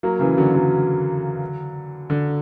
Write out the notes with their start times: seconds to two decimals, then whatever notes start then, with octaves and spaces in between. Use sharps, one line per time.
0.03 F#3 A#3
0.19 C#3 E3
0.37 D3 F#3
0.54 D3 F#3
2.10 D3